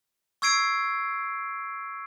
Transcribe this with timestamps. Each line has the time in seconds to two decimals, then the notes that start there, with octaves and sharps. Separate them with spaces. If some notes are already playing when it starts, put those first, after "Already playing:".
0.42 C#6 E6 G#6 C7 D7